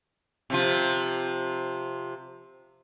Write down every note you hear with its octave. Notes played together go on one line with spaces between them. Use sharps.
C3 F3 F4